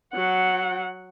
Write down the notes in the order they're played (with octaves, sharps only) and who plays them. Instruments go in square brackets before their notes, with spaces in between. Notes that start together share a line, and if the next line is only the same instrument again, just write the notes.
[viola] F#3 F#5